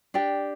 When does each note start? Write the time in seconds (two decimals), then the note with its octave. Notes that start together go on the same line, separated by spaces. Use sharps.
0.14 D4 G4 D5 G5